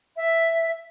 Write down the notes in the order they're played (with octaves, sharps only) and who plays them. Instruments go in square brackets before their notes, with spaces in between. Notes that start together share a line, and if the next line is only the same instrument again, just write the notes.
[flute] E5